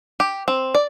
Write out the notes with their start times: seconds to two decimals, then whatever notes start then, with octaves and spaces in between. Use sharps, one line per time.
0.20 G4
0.48 C4
0.75 D5